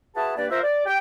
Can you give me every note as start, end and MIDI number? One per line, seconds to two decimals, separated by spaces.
0.16 0.35 64
0.16 0.35 66
0.16 0.35 68
0.16 0.35 71
0.16 0.35 81
0.38 0.49 43
0.38 0.49 58
0.38 0.49 71
0.38 0.49 74
0.51 0.63 65
0.51 0.63 70
0.51 0.63 72
0.51 0.63 76
0.63 0.83 74
0.86 0.97 67
0.86 0.97 79